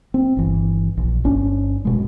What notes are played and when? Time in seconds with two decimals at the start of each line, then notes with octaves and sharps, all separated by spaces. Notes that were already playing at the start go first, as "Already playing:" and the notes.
0.14 C4
0.37 G1 E3
0.97 A#1
1.24 G1 C#4 D4
1.85 F#1 B2 G#3